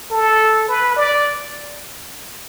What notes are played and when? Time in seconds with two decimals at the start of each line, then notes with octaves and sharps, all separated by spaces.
0.11 A4
0.68 B4
0.96 D5